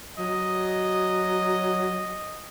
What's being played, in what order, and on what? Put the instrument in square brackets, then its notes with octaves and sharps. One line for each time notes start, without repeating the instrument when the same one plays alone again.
[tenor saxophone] F#3 [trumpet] D#5